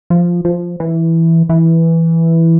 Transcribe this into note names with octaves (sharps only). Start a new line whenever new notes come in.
F3
F3
E3
E3